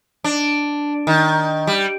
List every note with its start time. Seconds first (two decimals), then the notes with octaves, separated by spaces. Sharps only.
0.24 D4
1.07 D#3
1.67 G3